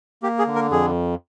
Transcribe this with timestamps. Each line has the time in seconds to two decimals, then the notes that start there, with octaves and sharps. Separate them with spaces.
0.23 A#3 G4
0.39 G#4
0.47 D3
0.55 A#4
0.71 F2 G#4